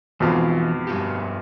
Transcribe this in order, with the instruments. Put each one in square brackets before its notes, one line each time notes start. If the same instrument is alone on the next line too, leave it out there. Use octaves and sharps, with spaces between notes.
[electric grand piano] F2 G#2 B2 [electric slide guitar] E3 F4
[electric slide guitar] G2 F#4 G4